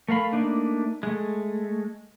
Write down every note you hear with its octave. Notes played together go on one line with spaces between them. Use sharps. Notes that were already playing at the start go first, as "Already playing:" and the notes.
A3 A#4 F5 B5
A3 A#3 D4 D#4
G#3 A3